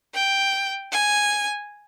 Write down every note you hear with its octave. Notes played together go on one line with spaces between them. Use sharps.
G5
G#5